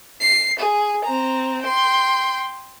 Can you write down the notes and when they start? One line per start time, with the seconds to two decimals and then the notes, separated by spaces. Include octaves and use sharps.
0.21 C7
0.59 G#4
1.04 C4 A#5
1.62 G5 C6